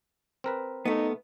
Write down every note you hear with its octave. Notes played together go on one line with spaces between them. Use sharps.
C4 A#4 B4
A3 B3 D#4